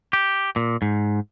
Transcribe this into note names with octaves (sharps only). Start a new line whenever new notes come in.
G4
A#2
G#2